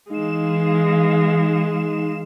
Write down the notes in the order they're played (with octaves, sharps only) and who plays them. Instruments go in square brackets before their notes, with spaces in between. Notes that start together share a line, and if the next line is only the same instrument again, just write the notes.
[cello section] E3 F5 [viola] G#3 [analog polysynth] D#4 E7